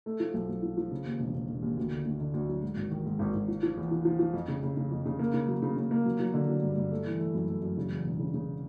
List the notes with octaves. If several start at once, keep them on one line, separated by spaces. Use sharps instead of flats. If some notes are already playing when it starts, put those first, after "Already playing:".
A3
F3
B1
B1
F3
F3
C#3
D#2
E1
E1
E1
D#2
D2
D3
D2
D3
D2
F#3
G#2
G#1
D#3
G#2
G#1
G#1
F3
F3
E2
F3
F3
F3
F2
C#3
C#3
C#3
F2
C#3
A#3
C#3
F#3
C#3
C#3
A#3
F#3
F#3
D3
F#3
G2
G2
A3
E3
A3
F#2
A3
F#2
C#3
E2
E1
C#3
C#3